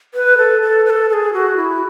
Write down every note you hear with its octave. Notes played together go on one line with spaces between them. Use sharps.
B4
A4
A4
B4
A4
A4
G#4
F#4
E4